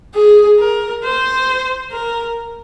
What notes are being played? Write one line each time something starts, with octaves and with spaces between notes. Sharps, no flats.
G#4
A#4
C5
A#4